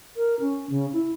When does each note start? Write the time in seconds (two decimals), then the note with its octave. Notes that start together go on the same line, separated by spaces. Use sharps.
0.17 A#4
0.40 C#4
0.70 C#3
0.93 E4